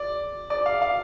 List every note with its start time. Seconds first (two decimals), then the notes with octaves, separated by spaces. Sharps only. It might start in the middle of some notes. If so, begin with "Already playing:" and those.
Already playing: D5
0.50 D5
0.66 F5
0.82 F5